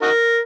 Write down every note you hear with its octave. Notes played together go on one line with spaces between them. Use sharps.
D#4 F#4 A#4